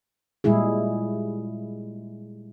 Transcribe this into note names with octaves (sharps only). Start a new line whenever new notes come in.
A#2 G3 G#3 E4 G#4